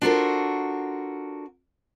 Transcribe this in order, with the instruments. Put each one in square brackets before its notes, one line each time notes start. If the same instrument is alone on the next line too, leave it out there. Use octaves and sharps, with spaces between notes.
[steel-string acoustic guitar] D4 F4 F#4 A4 A#4 C5